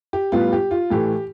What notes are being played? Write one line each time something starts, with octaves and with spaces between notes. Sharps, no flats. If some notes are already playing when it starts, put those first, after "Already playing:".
G4
A2 G3 B3 F4
G4
F4
A2 E3 A3 G4